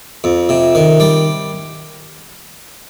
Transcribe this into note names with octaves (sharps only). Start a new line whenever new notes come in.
F2
C3
D#3
G3